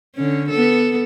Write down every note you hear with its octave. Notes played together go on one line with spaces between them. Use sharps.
D3 C#4
B3 A4